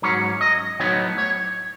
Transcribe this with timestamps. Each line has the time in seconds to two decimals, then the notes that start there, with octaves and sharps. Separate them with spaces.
0.02 G#2 F#3 C#4 C#5
0.41 D#5
0.80 A2 F#3 B3 D#4 C#5
1.18 C#5